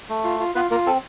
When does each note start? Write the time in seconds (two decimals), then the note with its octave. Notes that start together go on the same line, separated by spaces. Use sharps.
0.09 A3
0.24 F4
0.40 F4
0.55 B3 F4 B4
0.71 A#3 F4 A#4
0.86 C4 A4